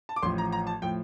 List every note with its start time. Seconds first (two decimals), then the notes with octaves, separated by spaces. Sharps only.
0.09 A5
0.16 D6
0.22 A1 A2 F3 C6
0.38 A#5
0.52 A#5
0.67 A5
0.82 A2 F3 G5